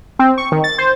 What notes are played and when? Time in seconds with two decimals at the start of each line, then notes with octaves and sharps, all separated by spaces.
0.19 C4
0.38 C#6
0.52 D#3
0.64 A6
0.78 C5